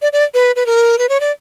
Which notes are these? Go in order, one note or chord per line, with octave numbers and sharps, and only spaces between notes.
D5
D5
B4
B4
A#4
B4
C#5
D5